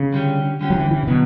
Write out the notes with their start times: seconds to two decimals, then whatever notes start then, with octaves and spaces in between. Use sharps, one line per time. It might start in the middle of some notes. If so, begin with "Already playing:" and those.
Already playing: C#3
0.13 D3 G3 C#4 G4
0.61 D3 G3 C#4 G4
0.70 F#3
0.76 E3
0.91 E3
1.03 C#3
1.07 B2 D3 F#3 B3